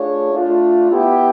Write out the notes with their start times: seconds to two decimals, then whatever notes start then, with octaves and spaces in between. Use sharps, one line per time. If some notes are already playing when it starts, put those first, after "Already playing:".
Already playing: A3 D4 F4 G#4 C#5
0.33 A3 D4 F4
0.91 B3 E4 G4